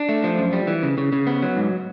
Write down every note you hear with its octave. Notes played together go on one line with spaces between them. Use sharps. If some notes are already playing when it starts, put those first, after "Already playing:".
Already playing: D4
A3
F3
F#2
G3
E3
C#3
C#3
C#3
B3
F#3
G#2